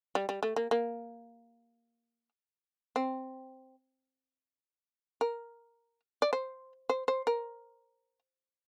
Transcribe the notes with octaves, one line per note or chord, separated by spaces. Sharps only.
G3
G3
A3
A#3
A#3
C4
A#4
D5
C5
C5
C5
A#4